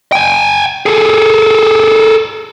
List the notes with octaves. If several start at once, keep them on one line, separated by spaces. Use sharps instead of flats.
G5 G#5
G#4 A4